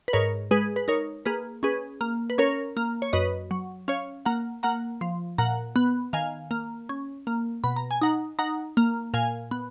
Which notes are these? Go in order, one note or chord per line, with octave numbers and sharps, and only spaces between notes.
B4
G#2 A#4 C#5
G#3 G#4 B4
B4
D#4 A#4 C#5
A#3 G#4 B4
C#4 G#4 B4
A#3
B4
C#4 A#4 C#5
A#3
C#5
F#2 B4 D#5
F#3
C#4 C#5 F5
A#3 F#5 A#5
A#3 F#5 A#5
F3
A#2 F#5 A#5
B3
D#3 F5 G#5
A#3
C#4
A#3
B2 B5
A#5
G#5
D#4 F#5 A#5
D#4 F#5 A#5
A#3
A#2 F5 G#5
B3